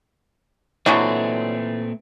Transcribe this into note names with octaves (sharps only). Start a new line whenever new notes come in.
A#2 D3 E3 F#3 G#3 A3 C4